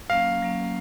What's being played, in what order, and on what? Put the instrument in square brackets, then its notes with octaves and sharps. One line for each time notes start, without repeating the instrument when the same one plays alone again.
[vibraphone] F#3 A#3 C#4 [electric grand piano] F5
[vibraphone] F#3 A#3 C#4